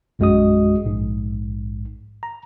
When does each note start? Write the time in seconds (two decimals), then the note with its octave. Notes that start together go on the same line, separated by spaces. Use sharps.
0.19 A#1 F#2 G#3 F#4 D#5 D#6
0.86 A#1 G#2
2.23 A#5